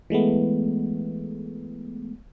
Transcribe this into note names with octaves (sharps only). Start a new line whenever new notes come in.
E3 G#3 A3 B3